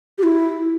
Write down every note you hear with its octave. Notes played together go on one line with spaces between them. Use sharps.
G4
E4